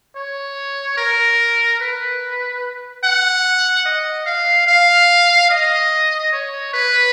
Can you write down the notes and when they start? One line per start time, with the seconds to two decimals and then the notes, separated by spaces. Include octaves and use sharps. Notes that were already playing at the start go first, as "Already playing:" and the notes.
0.16 C#5
0.97 A#4
1.80 B4
3.04 F#5
3.86 D#5
4.26 F5
4.67 F5
5.50 D#5
6.33 C#5
6.73 B4